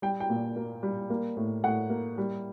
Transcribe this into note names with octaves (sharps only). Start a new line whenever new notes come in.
G3 G5
G5
A#2
A#3
G3
A#3
A2
A2 F#5
A#3
G3